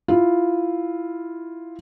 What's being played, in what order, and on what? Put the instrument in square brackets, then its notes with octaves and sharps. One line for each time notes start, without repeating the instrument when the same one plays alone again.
[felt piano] E4 F4